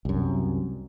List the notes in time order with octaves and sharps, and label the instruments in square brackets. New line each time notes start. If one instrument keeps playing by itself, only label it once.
[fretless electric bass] C2 F#2